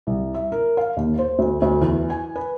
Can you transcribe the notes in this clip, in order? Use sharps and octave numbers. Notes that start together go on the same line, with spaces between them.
C2
E5
A#4
F5
D#2
C5
D2
D2
E2
G#5
B4